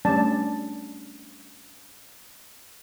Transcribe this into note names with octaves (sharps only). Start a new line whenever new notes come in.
G3 A3 C#4 D4 D5 A5